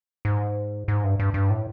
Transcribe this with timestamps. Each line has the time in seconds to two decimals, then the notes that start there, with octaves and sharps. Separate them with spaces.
0.25 G#2
0.88 G#2
1.04 G2
1.20 G2
1.34 G2
1.50 A2